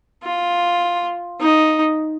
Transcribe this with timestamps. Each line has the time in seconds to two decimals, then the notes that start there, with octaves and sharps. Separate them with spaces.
0.24 F4
1.40 D#4